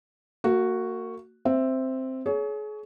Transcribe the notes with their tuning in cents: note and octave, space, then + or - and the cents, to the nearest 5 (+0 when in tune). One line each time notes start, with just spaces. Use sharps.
A#3 -35 F#4 +0
C4 +0 E5 +0
G#4 +35 C#5 +20